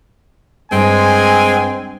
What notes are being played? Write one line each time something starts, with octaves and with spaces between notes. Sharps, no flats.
G2 G#3 C4 G#5